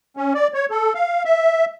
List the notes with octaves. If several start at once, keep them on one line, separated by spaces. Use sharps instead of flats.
C#4
D5
C#5
A4
F5
E5